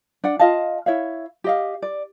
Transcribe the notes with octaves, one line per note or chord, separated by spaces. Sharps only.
D4 D5 F#5
F4 D#5 F5 A5
E4 C#5 E5 F5
G4 D#5 F5
D5